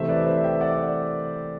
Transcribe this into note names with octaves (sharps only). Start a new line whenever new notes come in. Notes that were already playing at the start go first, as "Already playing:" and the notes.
Already playing: C3 E3 A3 C5 E5
B4 D5
C5 E5
E5 G5
D5 F#5